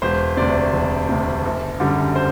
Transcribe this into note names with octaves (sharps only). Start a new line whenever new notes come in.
E1 C5
D2 C3 D5
E1
D2 C3
F#1
F#2 D3 G3
C5